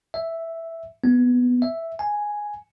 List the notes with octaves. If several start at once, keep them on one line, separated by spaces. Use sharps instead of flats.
E5
B3
E5
G#5